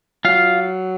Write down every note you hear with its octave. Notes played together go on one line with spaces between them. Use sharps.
F#3 F4 F5